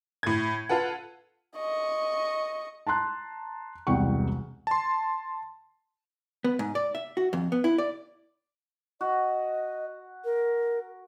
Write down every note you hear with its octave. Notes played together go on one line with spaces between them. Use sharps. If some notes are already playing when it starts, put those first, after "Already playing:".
A2 G#6
F4 A4 B4 F#5
D#5 C#6
A5 A#5 C6 F#6
E1 C2 F#5 G5 C#6
A5 C6
B3
G#2
D5
E5
F#4
F2
B3
E4
D5
F#4 D#5
A#4